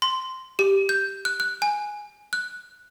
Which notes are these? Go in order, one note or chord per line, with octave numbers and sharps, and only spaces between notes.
C6
G4
G6
F#6
F#6
G#5
F#6